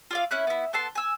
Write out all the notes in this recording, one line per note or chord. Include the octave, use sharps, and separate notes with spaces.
F4 D5 F5
C#4 E4 F#6
B3 E4
B3 A4 A5 C6
G#5 E6